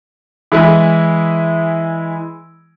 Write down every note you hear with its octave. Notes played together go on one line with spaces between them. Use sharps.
E3 G#3 E4